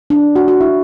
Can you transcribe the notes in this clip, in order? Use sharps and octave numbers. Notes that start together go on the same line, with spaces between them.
D4
F#4
F#4
E4